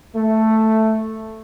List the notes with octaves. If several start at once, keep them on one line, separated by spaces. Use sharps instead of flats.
A3